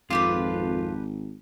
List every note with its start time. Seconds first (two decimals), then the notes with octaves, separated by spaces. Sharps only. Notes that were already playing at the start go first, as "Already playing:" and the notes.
0.10 G#1 F2 D4 F4 G4 B4